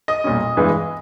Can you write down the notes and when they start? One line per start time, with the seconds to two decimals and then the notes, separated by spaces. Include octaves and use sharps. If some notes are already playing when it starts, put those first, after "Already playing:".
0.08 D#5 D#6
0.24 B1 A#2 G3 C#4
0.57 G2 E3 G#3 B3